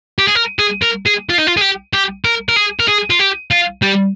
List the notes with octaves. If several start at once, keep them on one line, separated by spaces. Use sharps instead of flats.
G4
G#4
A#4
G#4
A#4
G#4
F4
D#4
F4
G#4
G4
G4
A#4
A#4
G#4
A#4
G#4
F4
G4
F4
G3